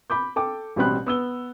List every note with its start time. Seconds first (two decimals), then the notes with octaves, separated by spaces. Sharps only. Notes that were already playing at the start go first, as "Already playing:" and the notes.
0.10 B5 D6 G6
0.36 A4 G5 D6
0.76 A1 B2 G3 C4 B5 F#6
1.06 B3 E6 G7